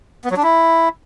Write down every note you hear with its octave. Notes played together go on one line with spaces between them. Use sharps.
B3
F#3
D4
E4